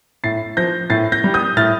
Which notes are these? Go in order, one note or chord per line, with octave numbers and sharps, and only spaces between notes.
A2 A6 C7
F3 G6 A#6
A2 A6 C7
G6 A#6
G3
D#6 G6
A2 F6 A6